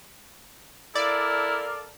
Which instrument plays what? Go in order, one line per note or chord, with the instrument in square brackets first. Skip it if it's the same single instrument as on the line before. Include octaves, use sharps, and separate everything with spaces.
[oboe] E4 [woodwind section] A4 A#4 F5 [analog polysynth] D5